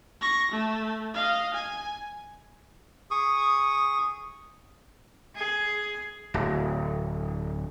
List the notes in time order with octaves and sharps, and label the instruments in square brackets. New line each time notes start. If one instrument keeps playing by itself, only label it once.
[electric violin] C#6 A#6
A3
D#5 F5
G#5
[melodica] G#4 C#6 D#6
[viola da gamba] G#4
[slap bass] D1